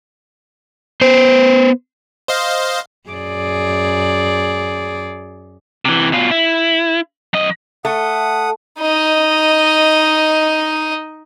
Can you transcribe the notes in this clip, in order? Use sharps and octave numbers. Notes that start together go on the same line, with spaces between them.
B3 C5
C5 D#5 F5
F#2 G#4 D5
C3 E3
B2 F4
E4
F#2 D#5
A3 F#5 D#6
D#4 D#5